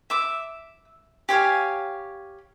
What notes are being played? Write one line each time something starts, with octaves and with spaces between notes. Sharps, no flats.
E5 D6
G4 C#5 F5 G#5